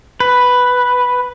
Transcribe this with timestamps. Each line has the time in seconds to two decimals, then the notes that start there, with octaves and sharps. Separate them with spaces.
0.20 B4